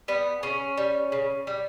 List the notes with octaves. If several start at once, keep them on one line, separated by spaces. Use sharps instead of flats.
G3 B3
C#3 C#4
G3
C#3
G3